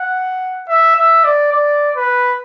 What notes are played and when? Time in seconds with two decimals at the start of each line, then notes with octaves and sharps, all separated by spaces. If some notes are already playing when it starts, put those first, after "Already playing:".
Already playing: F#5
0.69 E5
0.96 E5
1.25 D5
1.52 D5
1.96 B4